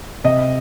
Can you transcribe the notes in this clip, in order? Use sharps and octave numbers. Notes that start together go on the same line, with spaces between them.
C3 D#5